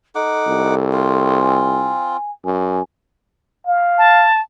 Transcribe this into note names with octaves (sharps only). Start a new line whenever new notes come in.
D#4 A4 F#5 D6
C2
C4 F4
G#5
F#2 G#5
F5
A5